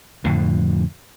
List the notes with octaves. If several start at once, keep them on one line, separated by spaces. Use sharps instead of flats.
F2 A2 D3 F3